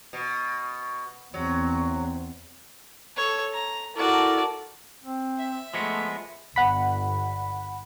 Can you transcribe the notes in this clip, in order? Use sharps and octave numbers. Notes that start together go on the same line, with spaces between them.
B2
E2 F#3 C4
A4 C#5
A#5
E4 F#4 A4 A#4 D5
C4
E5
F3 G#3 A3 B3
G1 F#5 B5